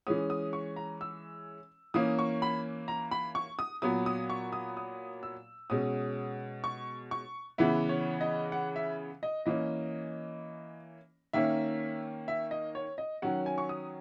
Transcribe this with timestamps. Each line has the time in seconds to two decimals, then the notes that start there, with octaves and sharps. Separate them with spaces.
0.07 E3 G#3 C#4 D#6
0.30 D#6
0.53 C#6
0.76 A#5
1.01 E6
1.94 E3 A#3 C#4 D#6
2.19 C#6
2.42 B5
2.88 A#5
3.11 B5
3.35 C#6
3.59 D#6
3.82 A#2 F#3 B3 D#6
4.06 D#6
4.30 C#6
4.53 D#6
4.77 D#6
5.23 E6
5.70 B2 G#3 C#4 D#6
6.64 C#6
7.11 C#6
7.58 C#3 E3 B3 E5
7.89 C#5
8.21 D#5
8.52 F#5
8.76 E5
9.23 D#5
9.46 E3 A#3 C#4 D#5
11.33 D#3 A#3 C#4 E5
12.28 E5
12.51 D#5
12.75 C#5
12.98 D#5
13.22 D#3 F#3 C#4 F#5
13.46 G#5
13.58 C#6
13.69 D#6